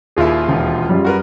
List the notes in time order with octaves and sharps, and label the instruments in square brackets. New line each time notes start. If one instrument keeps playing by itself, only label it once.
[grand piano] D#1 D#2 E4 [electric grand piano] F4 G#4
[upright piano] E1
F#2 G3
[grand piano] F#4 A#4 B4